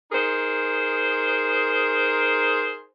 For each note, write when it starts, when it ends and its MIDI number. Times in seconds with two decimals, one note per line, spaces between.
0.12 2.84 63
0.12 2.84 68
0.12 2.84 70
0.12 2.84 72